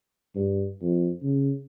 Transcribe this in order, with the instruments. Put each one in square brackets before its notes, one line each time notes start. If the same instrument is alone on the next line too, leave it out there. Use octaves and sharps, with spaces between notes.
[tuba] G2
F2
C#3